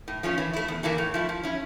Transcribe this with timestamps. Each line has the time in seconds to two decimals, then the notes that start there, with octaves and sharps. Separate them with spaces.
0.08 A2
0.23 F3 A3 C#4
0.38 E3
0.53 A3 E4
0.68 E2
0.83 E3 A#3 E4 A4
0.98 A2
1.14 F3 A3 E4
1.29 F3
1.43 C#4 E4